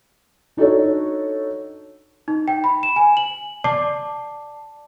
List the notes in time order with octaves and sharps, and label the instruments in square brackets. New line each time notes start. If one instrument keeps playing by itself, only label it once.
[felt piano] D4 D#4 F#4 A4 C#5
[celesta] D#4
G5
B5
E7
G#5
F#7
D5 A5 D6 C7